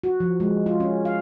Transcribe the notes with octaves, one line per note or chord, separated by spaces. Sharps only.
F#4
F3
G#3
F4
C#4
F5